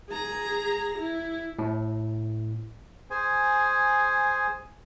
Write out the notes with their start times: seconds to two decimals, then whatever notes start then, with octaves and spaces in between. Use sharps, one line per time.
0.10 G#4 A#5
0.99 E4
1.59 A2
3.10 G#4 C5 G#5